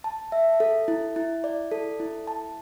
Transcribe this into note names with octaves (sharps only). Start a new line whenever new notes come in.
A5
E5
A4
E4
E4
D5
A4
E4
A5